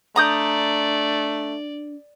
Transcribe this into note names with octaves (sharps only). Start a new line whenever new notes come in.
A3 D4 D5 A#5 D#6 G6